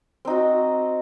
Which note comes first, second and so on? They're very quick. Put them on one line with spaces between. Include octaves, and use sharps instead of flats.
C4 D#4 F#4